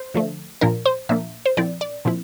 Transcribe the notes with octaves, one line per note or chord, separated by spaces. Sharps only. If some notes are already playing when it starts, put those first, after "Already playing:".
Already playing: C5
D3 F3 A3
A#2 F3 A#3 D4 A#4
C5
A#2 F3 A#3 D4 E5
C5
A#2 F3 C4 E4 D5
D5
A#2 F3 C4 E4